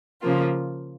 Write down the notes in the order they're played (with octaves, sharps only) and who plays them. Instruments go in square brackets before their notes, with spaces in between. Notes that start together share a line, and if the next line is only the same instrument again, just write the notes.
[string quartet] C#3 F3 A#3 F4